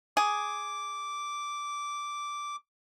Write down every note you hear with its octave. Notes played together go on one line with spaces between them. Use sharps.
G#4 D6